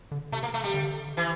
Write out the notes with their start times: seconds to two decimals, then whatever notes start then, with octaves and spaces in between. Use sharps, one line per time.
0.12 D3
0.32 C3 A3
0.43 A#3
0.54 A3
0.64 G3
0.74 D3
1.17 E3